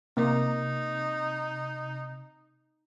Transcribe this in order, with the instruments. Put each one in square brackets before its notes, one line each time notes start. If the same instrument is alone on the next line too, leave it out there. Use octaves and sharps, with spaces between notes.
[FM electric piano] C3 [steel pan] A#3 [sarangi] D#4